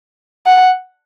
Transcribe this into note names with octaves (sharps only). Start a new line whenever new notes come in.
F#5